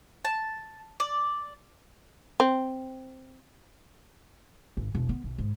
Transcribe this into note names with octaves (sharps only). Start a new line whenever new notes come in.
A5
D5
C4
G#1
E1 B1
B3
B1
G#2